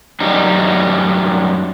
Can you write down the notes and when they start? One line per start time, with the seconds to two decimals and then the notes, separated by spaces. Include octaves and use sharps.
0.20 F#2 G3 D#4